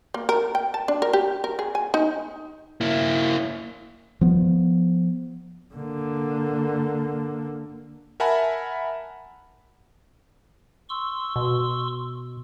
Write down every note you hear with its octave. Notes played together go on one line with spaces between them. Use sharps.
A#3
A#4
G5
A5
D4
A#4
G4
A#4
G#4
G#5
D#4
A#3 E4
F3 B3
D3 A#3
A#4 E5 F#5 G#5 A5 B5
C6 C#6 E6
B2